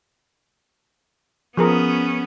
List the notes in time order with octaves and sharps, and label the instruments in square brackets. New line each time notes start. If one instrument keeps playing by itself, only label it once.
[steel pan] F3 G#4 A#4 [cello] B3 C#4